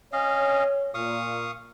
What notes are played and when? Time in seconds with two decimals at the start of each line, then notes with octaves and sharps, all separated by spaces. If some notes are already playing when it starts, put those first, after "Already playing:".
0.13 C#4 C#5 D#5 F5
0.94 A#2 F5 C#6 D#6